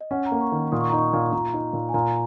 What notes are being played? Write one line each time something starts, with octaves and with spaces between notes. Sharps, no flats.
D#5
C#4 F#5
A#5
A#3
C#6
D#3
A#2 D#6
C#6
D#4 A#5
C#6
A#2
A#2 A#5
D#4
A#2
G#5
A#2 A#5